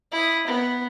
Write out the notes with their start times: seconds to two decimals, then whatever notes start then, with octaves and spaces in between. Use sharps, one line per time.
0.12 E4 D#6
0.47 B3